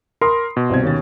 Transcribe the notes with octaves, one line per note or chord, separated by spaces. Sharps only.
A#4 B5 C6 D#6 C7
B2
C2 C4 G#6
D#2 C#4 A6